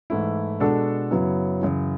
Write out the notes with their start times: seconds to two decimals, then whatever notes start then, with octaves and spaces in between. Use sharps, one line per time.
0.10 G#2 E3 A3 E4
0.60 B2 G#3 D4 F#4 A4
1.11 F#2 C#3 F#3 B3 E4
1.61 F#2 C#3 E3